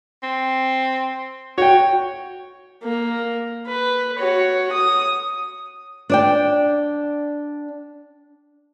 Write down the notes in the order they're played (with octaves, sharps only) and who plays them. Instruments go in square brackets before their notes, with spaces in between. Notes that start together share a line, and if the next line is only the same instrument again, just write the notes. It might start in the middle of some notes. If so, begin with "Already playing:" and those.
[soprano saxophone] C4
[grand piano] F#4 G5 [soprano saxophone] C#5
[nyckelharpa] A#3
B4
F#4 C#5
D#6
[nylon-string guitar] D4 D5 G5